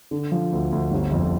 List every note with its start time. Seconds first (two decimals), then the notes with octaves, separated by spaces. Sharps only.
0.11 D3
0.32 F3
0.52 D2
0.72 D2
0.92 G1
1.12 F2